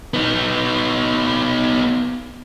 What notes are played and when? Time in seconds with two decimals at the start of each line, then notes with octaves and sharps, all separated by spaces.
0.14 B3 D#4